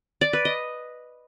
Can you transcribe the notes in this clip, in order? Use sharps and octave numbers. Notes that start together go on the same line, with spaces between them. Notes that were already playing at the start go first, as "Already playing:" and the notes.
D5
B4
D#5